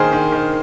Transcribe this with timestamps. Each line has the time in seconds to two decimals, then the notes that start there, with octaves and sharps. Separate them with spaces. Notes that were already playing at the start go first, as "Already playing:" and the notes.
Already playing: D#3 A#3 G#4 A#4 C5
0.13 D#3
0.32 D#3